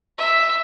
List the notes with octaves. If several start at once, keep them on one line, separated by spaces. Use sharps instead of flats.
E5